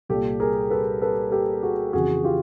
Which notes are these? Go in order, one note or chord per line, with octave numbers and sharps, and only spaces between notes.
C2 A#2 G4 A4
G#4 A#4
A4 B4
A4 B4
G4 A4
F#4 G#4
F2 C#3 E3 F#4 G#4
F4 G4